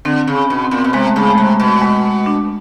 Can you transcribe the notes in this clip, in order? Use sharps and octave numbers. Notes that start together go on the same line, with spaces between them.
D3 C4
C#3
C#4
B2
C4
A#2 B3
C4
B2
C3 G#3
A3
C#3 G#3
A3
C3 G#3
B2
G#3
D4